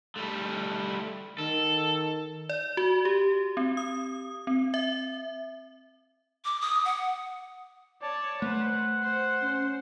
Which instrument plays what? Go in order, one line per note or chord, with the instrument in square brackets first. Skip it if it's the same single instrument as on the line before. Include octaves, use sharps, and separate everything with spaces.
[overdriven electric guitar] G3 A3
[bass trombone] D#3 [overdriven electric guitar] A4
[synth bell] D5
F#4
G4
C4
D#6
C4
E5
[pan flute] D6
D#6
F#5
[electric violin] C#5 A5 [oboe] D5
[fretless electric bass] A3 [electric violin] B4 C5 [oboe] F#5
[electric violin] C5
[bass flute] C#4